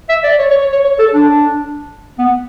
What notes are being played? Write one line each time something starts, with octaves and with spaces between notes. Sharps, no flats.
E5
D5
C#5
C#5
C#5
C#5
C#5
A4
D4
B3